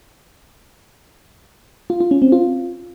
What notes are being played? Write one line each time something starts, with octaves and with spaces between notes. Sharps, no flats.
F4
F4
C#4
C4
F4